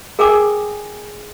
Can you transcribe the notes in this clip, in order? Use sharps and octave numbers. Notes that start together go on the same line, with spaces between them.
G#4 A#4 G5 G#5 D6 D#6